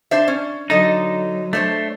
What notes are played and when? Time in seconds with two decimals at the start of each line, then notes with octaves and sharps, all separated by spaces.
0.11 D4 C5 E5
0.28 C#4
0.70 D3 F#3 D#4 A4 D#5
1.53 A3 D4 C5 C#5